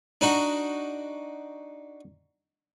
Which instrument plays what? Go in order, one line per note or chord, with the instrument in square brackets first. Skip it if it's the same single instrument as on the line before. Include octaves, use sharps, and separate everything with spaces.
[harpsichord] D4 D#4 F#4